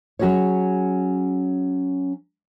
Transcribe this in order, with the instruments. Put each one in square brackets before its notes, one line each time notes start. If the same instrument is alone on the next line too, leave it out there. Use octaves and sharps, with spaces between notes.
[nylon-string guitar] F#3 C#4 F#4 G#4 C#5